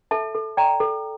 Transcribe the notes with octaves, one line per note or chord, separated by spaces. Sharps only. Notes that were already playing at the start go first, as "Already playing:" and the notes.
A4 E5 A5
A4
D5 G5 A#5
A4